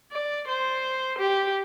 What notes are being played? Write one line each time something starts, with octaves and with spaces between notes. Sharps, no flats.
D5
C5
G4